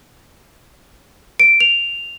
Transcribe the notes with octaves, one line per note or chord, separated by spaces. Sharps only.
D7
F7